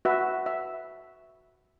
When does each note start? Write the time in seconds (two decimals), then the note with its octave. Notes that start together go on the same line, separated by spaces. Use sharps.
0.05 F#4 B4 E5
0.46 E5